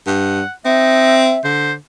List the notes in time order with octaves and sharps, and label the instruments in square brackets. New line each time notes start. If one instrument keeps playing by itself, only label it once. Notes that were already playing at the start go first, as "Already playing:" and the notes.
[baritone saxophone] G2 [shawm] F#5
[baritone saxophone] C4 [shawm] D#4 [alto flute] E5
[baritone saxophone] D3 [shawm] C5